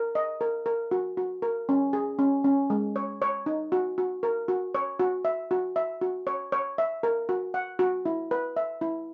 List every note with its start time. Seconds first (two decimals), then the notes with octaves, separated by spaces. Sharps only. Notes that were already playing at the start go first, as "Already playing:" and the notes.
Already playing: A#4
0.15 D#5
0.41 A#4
0.66 A#4
0.91 F#4
1.17 F#4
1.42 A#4
1.69 C#4
1.93 G#4
2.19 C#4
2.44 C#4
2.70 G#3
2.96 C#5
3.22 C#5
3.46 D#4
3.72 F#4
3.98 F#4
4.23 A#4
4.48 F#4
4.75 C#5
5.00 F#4
5.25 E5
5.51 F#4
5.76 E5
6.01 F#4
6.27 C#5
6.52 C#5
6.78 E5
7.03 A#4
7.29 F#4
7.54 F#5
7.79 F#4
8.06 E4
8.31 B4
8.57 E5
8.81 E4